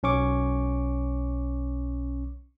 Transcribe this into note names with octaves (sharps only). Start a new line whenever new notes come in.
B1 C#4 C#6 D6